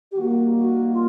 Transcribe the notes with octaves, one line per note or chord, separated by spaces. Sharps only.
G4
D#3 G3 A#3 F#4
F#4
F4